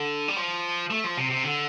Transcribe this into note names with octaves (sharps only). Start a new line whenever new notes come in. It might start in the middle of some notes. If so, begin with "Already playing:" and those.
Already playing: D3
G3
F3
A3
F3
C3
C3
D3